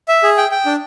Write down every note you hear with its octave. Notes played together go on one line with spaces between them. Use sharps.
E5
G#4
G5
G5
D4